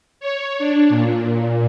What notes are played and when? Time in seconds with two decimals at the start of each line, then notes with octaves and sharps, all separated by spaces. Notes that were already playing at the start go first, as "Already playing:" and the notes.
0.20 C#5
0.59 D4
0.89 A#2